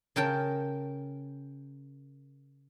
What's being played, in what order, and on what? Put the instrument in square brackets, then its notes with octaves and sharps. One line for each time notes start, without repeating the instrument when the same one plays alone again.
[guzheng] C#3 A#4 G5 A5